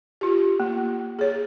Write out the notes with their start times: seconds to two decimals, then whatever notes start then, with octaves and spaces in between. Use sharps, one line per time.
0.21 F4 G4
0.60 A#3
1.19 G#4 C#5